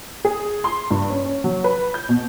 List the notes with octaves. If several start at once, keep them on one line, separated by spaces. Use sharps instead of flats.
G#4
C6
G2
C#4
C#4
F#3
B4
G6
B2